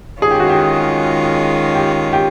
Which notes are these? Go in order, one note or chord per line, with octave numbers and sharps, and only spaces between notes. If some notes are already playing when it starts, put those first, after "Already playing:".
D#3 G#3 C#4 F4 G#4
G4
F#4
G4
G4
G4